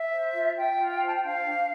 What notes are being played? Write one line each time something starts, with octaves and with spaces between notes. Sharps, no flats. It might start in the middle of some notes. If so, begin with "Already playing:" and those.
Already playing: E5
C5
F4
F4 G5
F4
C5
A5
G5
D4 F5
D4